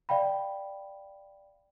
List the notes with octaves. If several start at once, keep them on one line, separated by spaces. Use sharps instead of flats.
D5 F5 G5 B5